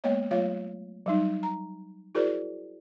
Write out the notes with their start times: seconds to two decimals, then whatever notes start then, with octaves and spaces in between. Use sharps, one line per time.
0.04 G#3 A#3 B3 C#5 D#5
0.31 F#3 A3 F4 C#5 F5
1.06 F#3 G3 D#4
1.43 A#5
2.15 E4 F#4 G#4 A#4 C5 D5